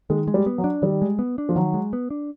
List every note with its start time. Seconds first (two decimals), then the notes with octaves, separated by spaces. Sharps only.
0.10 D#3 G#3
0.28 G#3
0.34 G3
0.46 B3
0.58 F#3
0.64 D4
0.82 D#3 G3
1.02 G#3
1.19 B3
1.38 D4
1.49 F3
1.56 D#3 F#3
1.74 G#3
1.93 B3
2.10 D4